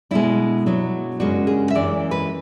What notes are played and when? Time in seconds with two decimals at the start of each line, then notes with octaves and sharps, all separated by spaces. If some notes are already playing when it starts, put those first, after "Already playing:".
0.11 B2 G#3 B3 D4 E4
0.66 B2 F#3 B3 D4
1.20 F#2 C#3 G#3 D4 F#4
1.47 G#4
1.70 E5
1.75 F#2 E3 G#3 D5
2.11 B4